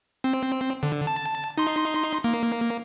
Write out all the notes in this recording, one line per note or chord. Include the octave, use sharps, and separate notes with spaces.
C4
D3
A5
D#4 C6
A#3